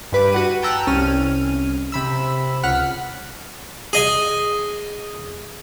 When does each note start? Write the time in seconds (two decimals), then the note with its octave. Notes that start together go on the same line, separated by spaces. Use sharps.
0.12 G2 B4 D6
0.32 F#4 F#5 D#7
0.62 G5 A5 A#5 E6 F#6
0.87 C2 C#4 F6 D#7
1.92 C3 B5 E6
2.63 C#2 F#5 F6 F#6 B6
3.93 G#4 D#5 G#5